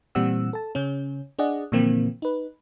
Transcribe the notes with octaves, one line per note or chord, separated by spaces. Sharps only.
A#2 E3 G3 C4 F#5 E6
A4 A5
C#3 C#4
D4 G#4 D5 D#5 F#5
A#2 D3 E3 F3 A#3 C4
D#4 B4